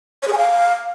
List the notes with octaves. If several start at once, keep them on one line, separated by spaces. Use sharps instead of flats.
C#5
G#4
G#5
F5